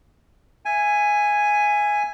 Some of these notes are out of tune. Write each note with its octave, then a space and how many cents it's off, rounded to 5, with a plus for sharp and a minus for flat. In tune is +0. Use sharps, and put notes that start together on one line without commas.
E5 +20 G#5 +0